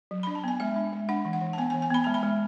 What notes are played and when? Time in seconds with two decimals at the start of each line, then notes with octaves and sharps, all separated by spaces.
0.11 F#3
0.23 D4 B5
0.35 A5
0.44 B3 G#5
0.60 G#3 E5
0.76 D4
0.93 G#3
1.09 D4 F#5
1.25 E3
1.33 F#5
1.41 E3
1.53 A5
1.58 B3 G#5
1.70 G#5
1.74 E3
1.82 G#5
1.90 B3 B5
2.04 G#3 A5
2.14 B5
2.23 G#3